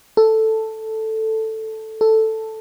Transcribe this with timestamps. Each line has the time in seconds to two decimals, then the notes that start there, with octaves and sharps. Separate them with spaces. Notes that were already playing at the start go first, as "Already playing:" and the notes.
0.17 A4
2.01 A4